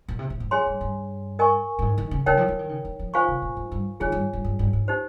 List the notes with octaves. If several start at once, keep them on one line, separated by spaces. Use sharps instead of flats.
A#2
C3
A#2
G#2
F2 G#4 C#5 G#5 C6
G2
G2
A#4 D#5 G#5 C#6
G2
G#2
D#3
C#3
C#3 D#4 A#4 C#5 G5
F3
F3
D#3
C#3
D#3
F3
D#3 F4 C5 F5 G#5 C#6
C3
A#2
G#2
G2
D#3 F4 G#4 C#5 G#5
G2
G2
G2
G2
G#2
D#4 G4 C5